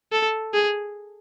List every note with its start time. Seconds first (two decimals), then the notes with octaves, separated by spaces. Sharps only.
0.12 A4
0.53 G#4